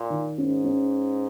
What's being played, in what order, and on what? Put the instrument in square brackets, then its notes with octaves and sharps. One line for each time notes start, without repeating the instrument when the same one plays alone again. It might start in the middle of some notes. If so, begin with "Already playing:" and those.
Already playing: [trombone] A#2
[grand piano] D#3
[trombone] G#2 [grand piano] C#4
[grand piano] C#4